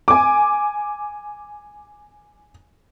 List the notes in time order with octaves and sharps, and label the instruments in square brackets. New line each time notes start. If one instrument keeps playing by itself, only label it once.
[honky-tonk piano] G#5 D6